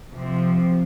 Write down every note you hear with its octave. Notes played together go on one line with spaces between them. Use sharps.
C3 F3